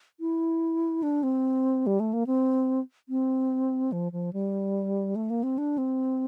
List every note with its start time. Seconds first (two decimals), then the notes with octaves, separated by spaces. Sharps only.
0.20 E4
1.03 D4
1.23 C4
1.87 G3
2.00 A3
2.13 A#3
2.27 C4
3.09 C4
3.92 F3
4.12 F3
4.33 G3
5.16 A3
5.30 A#3
5.43 C4
5.58 D4
5.78 C4